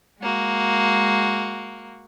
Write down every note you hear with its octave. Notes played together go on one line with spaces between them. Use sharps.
G#3 A#3 F#4